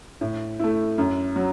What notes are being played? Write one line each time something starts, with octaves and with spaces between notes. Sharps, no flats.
A2
A3 E4
F#2
F#3